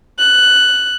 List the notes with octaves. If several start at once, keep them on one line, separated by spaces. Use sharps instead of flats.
F#6